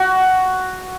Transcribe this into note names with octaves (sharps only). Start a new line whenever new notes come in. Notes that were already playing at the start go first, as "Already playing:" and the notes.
Already playing: F#4